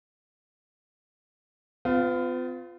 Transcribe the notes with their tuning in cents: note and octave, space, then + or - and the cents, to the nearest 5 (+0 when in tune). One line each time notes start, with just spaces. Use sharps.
B3 +45 F4 +0